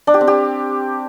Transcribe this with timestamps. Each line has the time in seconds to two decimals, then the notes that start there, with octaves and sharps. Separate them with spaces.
0.07 D4
0.14 G4
0.21 C4
0.27 G4